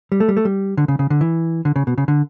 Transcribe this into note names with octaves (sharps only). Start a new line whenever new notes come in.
G3
A3
G3
A3
G3
D3
C#3
C#3
D3
E3
D3
C#3
B2
C#3
D3